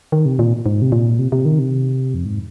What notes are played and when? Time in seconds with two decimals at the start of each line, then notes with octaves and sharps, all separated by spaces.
0.12 D#3
0.26 C3
0.39 A#2
0.66 G#2
0.82 C3
0.92 A#2
1.19 C3
1.32 C3
1.45 D#3
1.59 C3
2.14 F2
2.25 G#2